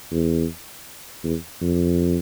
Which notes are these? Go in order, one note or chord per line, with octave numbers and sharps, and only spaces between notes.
E2
E2
F2